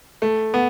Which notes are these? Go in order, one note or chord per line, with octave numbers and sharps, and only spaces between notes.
A3
B3